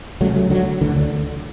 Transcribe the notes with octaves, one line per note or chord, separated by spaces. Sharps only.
C#2 C#3 F#3 A3
F#3 A3
D3 F#3
D2 D3 E3
D3